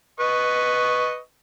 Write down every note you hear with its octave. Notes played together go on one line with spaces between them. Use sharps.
B4 D#5 C#6